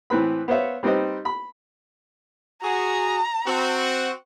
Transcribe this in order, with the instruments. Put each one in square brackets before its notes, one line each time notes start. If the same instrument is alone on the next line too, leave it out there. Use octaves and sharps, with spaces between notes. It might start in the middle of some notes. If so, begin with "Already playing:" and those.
[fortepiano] A2 E3 C4 B4 B5
B3 C5 C#5 E5 F5
G3 C4 D#4 B4 C5 D#5
B5
[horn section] F#4 G#4 [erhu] A#5
[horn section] C4 F#4